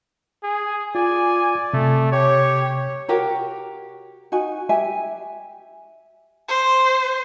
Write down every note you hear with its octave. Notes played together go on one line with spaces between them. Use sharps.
G#4
F4 D5 G#5
C3 A3
G4 C#5
F#4 G4 A#4 C#5
D#4 F#4 G#5
G4 E5 G#5
C5